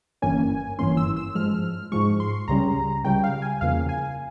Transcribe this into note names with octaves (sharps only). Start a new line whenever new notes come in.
G1 G2 E3 A#3 C#4 G#5
G1 G2 E3 A#3 C#4 C6
E6
E6
G#2 F3 G#3 F6
G#2 F3 G#3 C#6
C6
C#2 C#3 G3 C#4 A#5
C#2 C#3 G3 C#4 G5
F5
G#5
E2 C#3 F3 A#3 F5
G#5